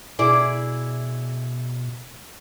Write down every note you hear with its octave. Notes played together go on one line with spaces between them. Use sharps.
B2 E4 G#4 D5